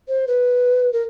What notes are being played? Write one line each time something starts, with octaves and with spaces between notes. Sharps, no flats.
C5
B4
A#4